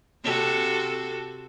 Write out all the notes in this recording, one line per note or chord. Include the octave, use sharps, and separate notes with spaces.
C3 F#4 A4